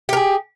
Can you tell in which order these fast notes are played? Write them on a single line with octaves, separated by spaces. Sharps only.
G4 A#4 G#4